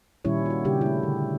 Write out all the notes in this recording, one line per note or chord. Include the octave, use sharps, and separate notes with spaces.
A#2 D#3 G3 C#4 E4 C#5
F4 F#4
C#3 G3 D4 G4
A3 E4
D3